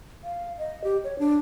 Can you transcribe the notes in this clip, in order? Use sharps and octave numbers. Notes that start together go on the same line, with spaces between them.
F5
D#5
G4
C#5
D4